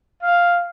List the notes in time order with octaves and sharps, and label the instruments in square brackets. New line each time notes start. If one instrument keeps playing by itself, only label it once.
[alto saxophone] F5